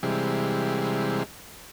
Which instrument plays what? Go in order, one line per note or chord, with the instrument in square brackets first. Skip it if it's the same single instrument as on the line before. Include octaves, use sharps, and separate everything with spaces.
[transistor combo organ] C3 E3 G3 G#3